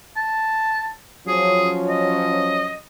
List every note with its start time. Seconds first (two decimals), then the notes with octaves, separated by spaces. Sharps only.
0.16 A5
1.27 F3 F#3 C#4 G#4
1.88 D#5